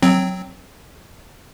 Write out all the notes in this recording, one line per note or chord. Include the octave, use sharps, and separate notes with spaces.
F#3 C4